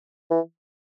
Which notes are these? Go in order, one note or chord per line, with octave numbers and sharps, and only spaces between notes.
E3